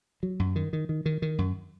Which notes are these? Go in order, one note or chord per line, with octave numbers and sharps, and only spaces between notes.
F#3
F#2
D#3
D#3
D#3
D#3
D#3
F#2